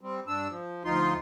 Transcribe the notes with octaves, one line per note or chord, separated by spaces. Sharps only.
G3 C4
G2 D4 E6
F3
D2 F3 D#4 F4 C6